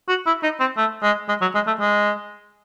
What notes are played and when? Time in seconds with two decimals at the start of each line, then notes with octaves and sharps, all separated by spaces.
0.09 F#4
0.27 E4
0.43 D#4
0.60 C4
0.77 A3
1.03 G#3
1.29 G#3
1.41 F#3
1.55 G#3
1.67 A3
1.80 G#3